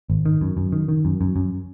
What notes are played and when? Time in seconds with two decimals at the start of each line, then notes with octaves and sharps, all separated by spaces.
0.10 G#1
0.26 D#3
0.41 F#2
0.57 F#2
0.72 D#3
0.88 D#3
1.05 F#2
1.21 F#2
1.36 F#2